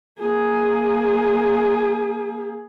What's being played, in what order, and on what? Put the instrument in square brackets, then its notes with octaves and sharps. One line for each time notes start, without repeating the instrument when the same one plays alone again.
[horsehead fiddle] A#3 G#4